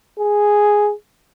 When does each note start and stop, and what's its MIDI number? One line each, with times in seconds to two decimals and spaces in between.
0.19 0.93 68